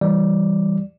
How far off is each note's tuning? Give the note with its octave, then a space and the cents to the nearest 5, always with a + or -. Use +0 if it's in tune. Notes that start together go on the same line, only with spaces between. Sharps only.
E3 +0 G3 +0 D5 +0